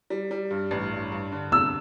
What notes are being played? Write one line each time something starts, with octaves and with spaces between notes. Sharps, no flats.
G3
G3
G2
A1
G2
G2
D3
C3 E6